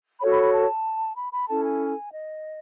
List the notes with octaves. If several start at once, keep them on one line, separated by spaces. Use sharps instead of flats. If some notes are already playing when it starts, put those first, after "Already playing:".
F#4 A4 C#5 B5
B5
B5
A5
B5
B5
C#4 E4 A4 A5
G#5
D#5